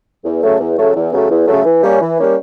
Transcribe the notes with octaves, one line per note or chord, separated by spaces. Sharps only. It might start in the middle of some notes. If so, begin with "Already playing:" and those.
E2
C#3 F#3 A3
E2
C#3 F#3 A3
E2
C#3 F#3 A3
E2
C#3 F#3 A3
E3
G3 A#3 C#4
E3
G3 A#3 C#4